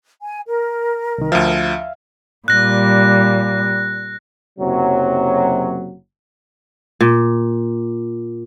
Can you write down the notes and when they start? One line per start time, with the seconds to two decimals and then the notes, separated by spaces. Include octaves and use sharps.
0.21 G#5
0.46 A#4
1.18 C2 D#3
1.32 D2 F3 E5 F5
2.48 A#2 G3 F#6 A#6
4.59 F#1 C3 F#3
7.01 A#2